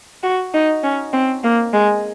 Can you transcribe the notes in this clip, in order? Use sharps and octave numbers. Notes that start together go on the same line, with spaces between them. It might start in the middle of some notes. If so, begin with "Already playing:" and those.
F#4
D#4
C#4
C4
A#3
G#3